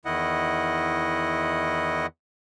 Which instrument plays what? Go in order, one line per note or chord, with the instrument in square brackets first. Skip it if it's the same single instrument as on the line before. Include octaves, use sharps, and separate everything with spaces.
[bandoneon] E2 D#3 E4 D#5 F#5